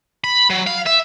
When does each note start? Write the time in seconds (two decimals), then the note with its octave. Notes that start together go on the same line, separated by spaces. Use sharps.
0.24 B5
0.50 F#3
0.67 F5
0.86 E5